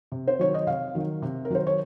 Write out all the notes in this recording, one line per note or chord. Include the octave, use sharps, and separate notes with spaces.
C3
C5
D#3 F#3 C#5
D#5
C3 F5
D#3 F#3
C3
A#4
D#3 F#3 C5
C#5